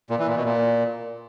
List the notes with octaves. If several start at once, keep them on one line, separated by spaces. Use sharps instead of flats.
A#2
E3
A#2
B2
A#2